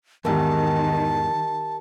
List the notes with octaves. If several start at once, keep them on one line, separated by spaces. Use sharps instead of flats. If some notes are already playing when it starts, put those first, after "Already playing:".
E2 G#2 D#3 G4 A#4 A5